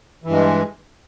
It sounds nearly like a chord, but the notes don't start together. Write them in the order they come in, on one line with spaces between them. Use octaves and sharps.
E3 G2 G#3